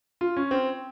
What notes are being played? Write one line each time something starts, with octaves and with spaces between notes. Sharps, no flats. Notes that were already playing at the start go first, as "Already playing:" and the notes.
F4
C#4
C4